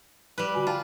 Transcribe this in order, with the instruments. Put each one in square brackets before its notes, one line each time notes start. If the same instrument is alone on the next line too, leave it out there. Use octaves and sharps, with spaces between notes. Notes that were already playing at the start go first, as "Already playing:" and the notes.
[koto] G3 B4
[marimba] D3 F#4 G#5
[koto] F4 [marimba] G5 A5